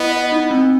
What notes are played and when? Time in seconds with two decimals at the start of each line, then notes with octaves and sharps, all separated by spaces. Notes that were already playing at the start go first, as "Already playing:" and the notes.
Already playing: B3 E4 D#5
0.12 D#5
0.32 D#4
0.51 C4